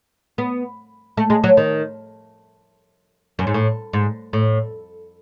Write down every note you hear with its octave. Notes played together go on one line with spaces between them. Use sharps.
B3
A3
G#3
F#3
D#3
F#2
G#2
A2
G#2
A2